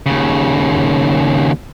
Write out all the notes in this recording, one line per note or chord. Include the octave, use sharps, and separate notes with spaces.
D#2 C#3